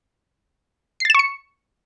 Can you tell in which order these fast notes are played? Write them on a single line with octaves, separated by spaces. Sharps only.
C7 A6 E7 C#6 C#7